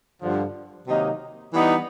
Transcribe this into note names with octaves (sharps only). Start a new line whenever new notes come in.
G2 D3 F3
C3 D#3 F#3 A#3 D#4
E3 G3 B3 D#4